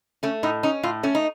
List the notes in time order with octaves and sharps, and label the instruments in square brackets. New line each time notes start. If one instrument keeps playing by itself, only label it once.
[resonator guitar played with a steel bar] A3 C#4
A2 D#4
C#4 D#4
A2 F4
A3 C#4
D#4